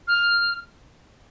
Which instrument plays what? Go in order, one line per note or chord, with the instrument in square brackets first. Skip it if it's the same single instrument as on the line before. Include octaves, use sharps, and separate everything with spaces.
[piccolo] F6